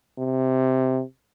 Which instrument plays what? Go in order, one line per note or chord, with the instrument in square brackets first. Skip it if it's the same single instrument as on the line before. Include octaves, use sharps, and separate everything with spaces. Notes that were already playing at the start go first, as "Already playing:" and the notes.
[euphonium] C3